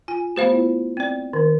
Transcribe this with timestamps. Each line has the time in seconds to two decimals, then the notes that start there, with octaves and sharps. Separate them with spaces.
0.08 F4 G#5
0.36 A3 B3 G4 C5 F5
0.53 B3 E4 F4
0.97 C4 D5
1.33 D#3 A#4